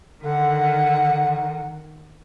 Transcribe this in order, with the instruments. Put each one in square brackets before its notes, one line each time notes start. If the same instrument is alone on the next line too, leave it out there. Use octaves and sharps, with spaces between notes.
[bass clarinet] D3 [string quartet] D#3 [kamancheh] F#5